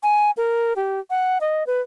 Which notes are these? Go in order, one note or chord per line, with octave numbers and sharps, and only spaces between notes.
G#5
A#4
G4
F#5
D#5
B4